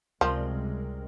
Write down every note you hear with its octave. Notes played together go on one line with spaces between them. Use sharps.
C#2 C3 F3 G3 G#3 A#4